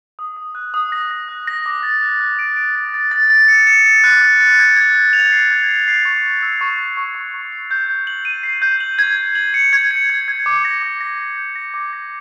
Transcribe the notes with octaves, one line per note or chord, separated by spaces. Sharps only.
D#6
D#6
F#6
D#6
A#6
A#6
F#6
A#6
D6
A6
F#6
F#6
D7
D7
A6
A6
A6
A6
C#7
C#7
C#7
F#6
A6
A6
G#6
G#6
G#6
F7
C7
G#6
C7
C7
C#6
A6
E6
C#6
A6
C#6
C#6
C#6
C7
G6
G6
F#7
D#7
C7
G6
F#7
G#6
G#6
F#7
C#7
G#6
C#7
G#6
G#6
D6
A#6
D6
A#6
A#6
G6
A#6
D6
A#6